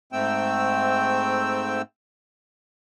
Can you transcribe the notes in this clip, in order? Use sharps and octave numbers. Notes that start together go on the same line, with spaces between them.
G#2 A3 C4 G5 E6